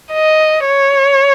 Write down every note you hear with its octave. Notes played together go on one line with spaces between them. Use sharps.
D#5
C#5